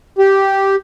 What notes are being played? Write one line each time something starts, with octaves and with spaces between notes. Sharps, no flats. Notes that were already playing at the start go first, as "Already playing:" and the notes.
G4